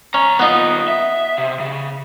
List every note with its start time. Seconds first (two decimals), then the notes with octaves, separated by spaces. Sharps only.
0.14 C#2 C#4 A#5
0.39 D#2 B3 D#4 F4
0.88 E5
1.38 C3
1.60 C#3